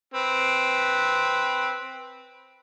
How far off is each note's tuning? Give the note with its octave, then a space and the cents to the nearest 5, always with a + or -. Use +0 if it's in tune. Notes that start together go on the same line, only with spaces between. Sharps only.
C4 +0 B4 -5